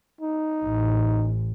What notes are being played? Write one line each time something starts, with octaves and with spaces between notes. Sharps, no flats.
D#4
A1